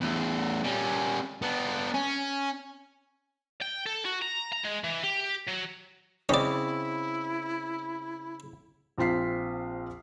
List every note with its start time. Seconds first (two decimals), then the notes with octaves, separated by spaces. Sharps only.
0.01 E2 A2
0.64 G3 C#4
1.42 B3 D4
1.94 C#4
3.62 G5
3.86 A4
4.05 F#4
4.22 A#5
4.53 A#5
4.65 G#3
4.84 E3
5.03 G4
5.48 F#3
6.29 C#3 C4 C#4 E4 D5 D#5
8.98 A#1 C4 F4 B6 C7